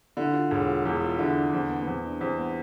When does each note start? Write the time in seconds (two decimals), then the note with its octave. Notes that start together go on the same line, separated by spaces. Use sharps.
0.17 D3 E4
0.33 F4
0.51 E1 G#4
0.68 F4
0.85 E2 G#4
1.02 F4
1.19 D3 E4
1.36 D4
1.53 E2 C4
1.70 B3
1.82 B3
1.87 E2 C4
2.05 D4
2.21 E2 C4
2.39 B3